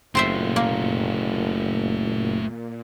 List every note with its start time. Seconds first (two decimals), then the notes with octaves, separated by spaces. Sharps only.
0.15 F#1 A#2 A3 C4 F4 C5 E5
0.56 A#3